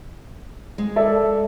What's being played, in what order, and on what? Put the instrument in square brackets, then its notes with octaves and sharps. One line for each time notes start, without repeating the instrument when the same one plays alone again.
[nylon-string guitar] G#3
[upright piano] A4 D5 E5